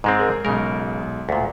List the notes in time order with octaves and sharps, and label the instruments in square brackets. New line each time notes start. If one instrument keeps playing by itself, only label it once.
[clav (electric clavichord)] G#2 G#3 C4
[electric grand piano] G#4 A#4
[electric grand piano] B1 G#3 [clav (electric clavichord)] C#3 A#4
[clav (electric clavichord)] D2 A#2